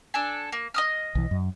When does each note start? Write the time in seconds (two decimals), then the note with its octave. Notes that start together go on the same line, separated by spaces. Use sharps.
0.14 D4 A4 G#5
0.52 A#3
0.74 D#5 D#6 F6
1.15 B1 E3
1.31 F#2